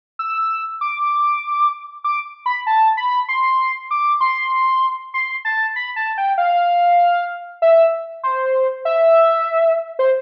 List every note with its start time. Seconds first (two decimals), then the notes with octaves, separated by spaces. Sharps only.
0.19 E6
0.81 D6
2.04 D6
2.46 B5
2.67 A5
2.97 B5
3.28 C6
3.91 D6
4.21 C6
5.14 C6
5.45 A5
5.76 B5
5.96 A5
6.18 G5
6.38 F5
7.62 E5
8.24 C5
8.85 E5
9.99 C5